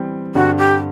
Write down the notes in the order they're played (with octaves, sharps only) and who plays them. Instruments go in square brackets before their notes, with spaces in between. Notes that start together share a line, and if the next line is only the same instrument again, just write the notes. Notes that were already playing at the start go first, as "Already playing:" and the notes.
Already playing: [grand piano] E3 G3 C4
[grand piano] G2 D3 G3 C4 [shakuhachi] F#4
[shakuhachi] G4